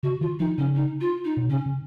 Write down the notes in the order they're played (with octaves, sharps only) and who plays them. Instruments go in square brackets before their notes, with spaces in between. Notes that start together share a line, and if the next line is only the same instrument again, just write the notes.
[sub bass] C#3 [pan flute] F#4
[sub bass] D#3 [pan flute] F4
[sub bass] F3 [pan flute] D#4
[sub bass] C#3 [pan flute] C#4
[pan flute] D#4
F4
D#4
[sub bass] B2
[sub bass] C#3 [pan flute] C#4
[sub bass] C#3